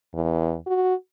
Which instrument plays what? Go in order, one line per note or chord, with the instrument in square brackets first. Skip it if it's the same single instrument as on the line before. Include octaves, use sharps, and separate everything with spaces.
[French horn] E2
F#4